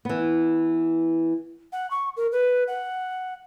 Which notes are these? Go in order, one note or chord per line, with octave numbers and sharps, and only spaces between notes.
E3 B3
F#5
C#6
A#4
B4
F#5